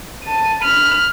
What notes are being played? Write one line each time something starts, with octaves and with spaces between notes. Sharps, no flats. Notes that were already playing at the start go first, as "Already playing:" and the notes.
A5 D#7
B5 F6